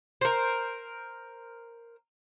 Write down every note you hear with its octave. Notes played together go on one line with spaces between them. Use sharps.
A#4 C5